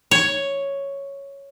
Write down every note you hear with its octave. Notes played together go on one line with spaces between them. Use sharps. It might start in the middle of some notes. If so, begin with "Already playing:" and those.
C#5